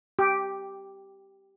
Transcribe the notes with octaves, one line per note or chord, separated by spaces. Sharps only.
G4